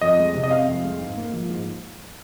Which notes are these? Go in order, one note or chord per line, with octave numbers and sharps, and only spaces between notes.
F2 D#5
G#3
C3
D#5
C4 F5
F2
G#3
G#2
A#3
F3
G#2